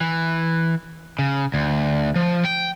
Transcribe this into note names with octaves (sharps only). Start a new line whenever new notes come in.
E3
C#3
D2
F3
G5